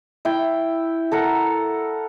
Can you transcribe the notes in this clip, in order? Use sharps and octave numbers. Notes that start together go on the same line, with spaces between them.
E4 G5
A4 A#4 F#5